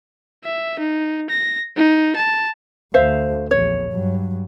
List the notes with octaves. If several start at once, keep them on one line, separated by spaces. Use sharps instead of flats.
E5
D#4
A#6
D#4
A5
D2 C5 E5 F5
A#1 E2 C#5
G2 F#3